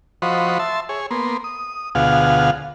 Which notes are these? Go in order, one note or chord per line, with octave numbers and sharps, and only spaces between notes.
F3 F#4 C5 D#5 B5 C#6
E5 A5 C6
G#4 C#5
A#3 B3 C6
D#6
D2 B2 F4 G#4 F5 F#5